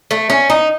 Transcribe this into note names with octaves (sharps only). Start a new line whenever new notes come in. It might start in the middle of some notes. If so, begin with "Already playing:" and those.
A3
C#4
D#4